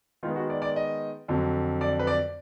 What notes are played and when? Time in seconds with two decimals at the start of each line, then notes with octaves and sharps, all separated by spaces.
0.23 D#3 G#3 B3 F4
0.36 F#4
0.50 D5
0.62 D5
0.76 D#5
1.28 F2 D3 F#3
1.81 D5
1.99 B4
2.07 D5